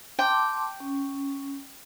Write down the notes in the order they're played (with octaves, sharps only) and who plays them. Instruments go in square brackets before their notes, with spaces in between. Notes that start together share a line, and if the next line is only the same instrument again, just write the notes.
[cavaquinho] G5 [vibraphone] A5 C6 D6
[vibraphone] C#4